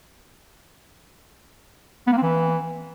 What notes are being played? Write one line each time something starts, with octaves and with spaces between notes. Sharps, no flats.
B3
A#3
C4
E3